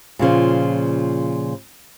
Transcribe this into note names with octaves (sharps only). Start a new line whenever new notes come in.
A#2 C#3 F3